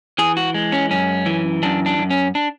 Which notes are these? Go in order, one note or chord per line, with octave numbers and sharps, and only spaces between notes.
E3 G#4
F#4
G#3
C#4
F#2 C#4
E3
F#2 D4
D4
F#2
C#4
D4